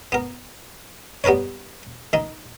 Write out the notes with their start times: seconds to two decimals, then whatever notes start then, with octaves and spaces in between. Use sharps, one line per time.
0.12 B3 A#4
1.24 G3 B3 A#4 B4 C#5
2.13 D#3 D#4